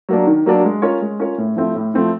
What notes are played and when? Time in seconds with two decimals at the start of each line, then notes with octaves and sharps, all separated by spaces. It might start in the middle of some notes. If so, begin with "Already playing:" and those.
0.09 F#3 A#3 D4
0.27 D#3
0.46 F#3 A#3 D4
0.65 G#3
0.82 C#4 F4 A#4 C#5
1.01 G#3
1.20 C#4 F4 A#4 C#5
1.38 A2
1.56 F3 A3 C4 E4
1.75 A2
1.94 F3 A3 C4 E4